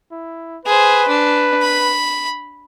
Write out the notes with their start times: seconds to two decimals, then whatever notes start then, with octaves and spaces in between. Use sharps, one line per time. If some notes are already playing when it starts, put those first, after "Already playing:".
0.12 E4
0.65 G#4 B4 C5
1.08 D4
1.61 B5